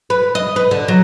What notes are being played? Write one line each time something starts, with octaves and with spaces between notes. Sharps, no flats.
B4
D#5
B4
D3
F#3